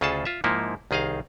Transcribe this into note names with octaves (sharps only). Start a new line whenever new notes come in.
D2 C#3 F4 G#4 A4 A5
F4 E5
G#2 F3 A#3 D#4 E4
C2 D#3 G#4 D#5 F5